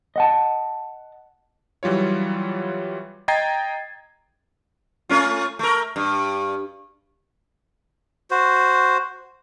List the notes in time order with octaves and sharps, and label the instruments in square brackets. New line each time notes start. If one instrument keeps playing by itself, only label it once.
[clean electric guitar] D#5 F#5 A5
[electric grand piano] E3 F#3 G3 F4 C#5
D#5 G5 A#5 G#6 A6 C7
[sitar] A3 C#4 F4
A3 A#4
G2
[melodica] F#4 C5